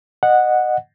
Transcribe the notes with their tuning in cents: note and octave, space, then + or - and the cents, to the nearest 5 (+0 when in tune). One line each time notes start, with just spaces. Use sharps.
D#5 -25 F#5 -10